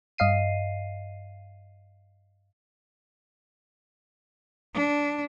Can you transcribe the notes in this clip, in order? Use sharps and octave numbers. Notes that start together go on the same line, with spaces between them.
G2 D#5 F5 C7 D#7
D4